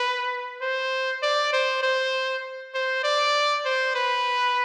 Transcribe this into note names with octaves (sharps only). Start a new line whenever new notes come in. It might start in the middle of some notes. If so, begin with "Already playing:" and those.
Already playing: B4
C5
D5
C5
C5
C5
D5
C5
B4